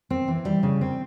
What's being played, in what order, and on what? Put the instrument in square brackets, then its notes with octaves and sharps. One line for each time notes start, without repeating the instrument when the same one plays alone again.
[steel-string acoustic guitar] C4
E3
G3
C#3
C4